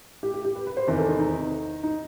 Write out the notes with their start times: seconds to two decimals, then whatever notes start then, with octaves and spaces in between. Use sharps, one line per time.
0.23 G4
0.34 G4
0.45 G4
0.55 B4
0.67 B4
0.77 C5
0.87 E2 C3 D#3 B4
0.98 A4
1.08 D#4
1.19 D#4
1.83 D#4